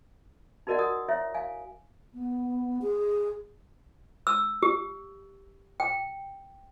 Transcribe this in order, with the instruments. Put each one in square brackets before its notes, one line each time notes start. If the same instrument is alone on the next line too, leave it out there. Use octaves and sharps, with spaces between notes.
[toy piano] D#4 F#4 A#4 D5 D#5 F#5
F#4 A#4 F#5 D#6
E4 C#5 E5
F5 G#5
[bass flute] B3
G#4
[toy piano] E6
G4
G5